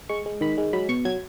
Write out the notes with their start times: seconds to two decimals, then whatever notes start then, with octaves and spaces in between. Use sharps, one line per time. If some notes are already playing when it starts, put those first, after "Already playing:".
0.09 G#3 C#6
0.26 G#3
0.41 D#3 B5
0.58 G#3
0.73 F#3 B5
0.89 B2 C#6
1.05 F#3 G#6